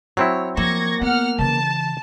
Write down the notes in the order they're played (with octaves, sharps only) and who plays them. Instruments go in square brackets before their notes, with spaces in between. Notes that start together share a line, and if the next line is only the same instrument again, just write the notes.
[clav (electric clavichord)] F#3 C4 E4 [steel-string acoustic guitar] C#5
[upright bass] F3 [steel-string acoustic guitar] A#3 [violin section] C#6 G#6 A#6
[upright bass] B3 [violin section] F#5 F6
[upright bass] C#3 E3 [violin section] A5